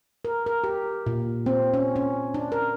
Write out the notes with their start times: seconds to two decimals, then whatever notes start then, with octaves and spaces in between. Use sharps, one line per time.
0.25 A#4
0.46 A#4
0.64 G4
1.06 A#2
1.46 C4
1.74 C#4
1.96 C#4
2.34 D4
2.52 A#4